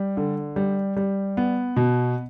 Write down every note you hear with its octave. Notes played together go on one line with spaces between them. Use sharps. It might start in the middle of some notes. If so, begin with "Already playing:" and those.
Already playing: G3
D3
G3
G3
B3
B2